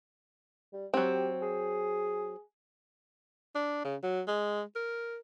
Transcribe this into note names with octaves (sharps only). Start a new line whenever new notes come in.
G3
F#3 C4 G4
G#4
D4
C#3
F#3
G#3
A#4